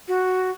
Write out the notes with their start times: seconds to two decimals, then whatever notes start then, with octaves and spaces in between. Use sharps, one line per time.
0.08 F#4